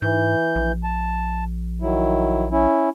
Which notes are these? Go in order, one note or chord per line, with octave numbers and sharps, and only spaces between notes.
G#2 E3 G6
A#1
A5
D#3 F#3 E4
C#4 E4